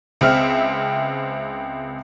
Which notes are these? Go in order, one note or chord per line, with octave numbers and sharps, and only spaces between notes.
C#2 C4 E5 F6